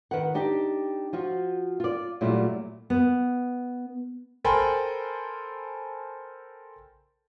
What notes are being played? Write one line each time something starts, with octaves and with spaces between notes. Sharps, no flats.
D#3 B4 F#5
D4 D#4 G4
F3 F4 F#4
F4 D5
A#2 F#3 G3 A3 E4 F4
B3
A4 A#4 C5 G5 G#5 B5